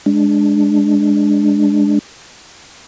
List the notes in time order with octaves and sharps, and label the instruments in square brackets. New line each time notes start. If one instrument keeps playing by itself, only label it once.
[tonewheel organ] G#3 D4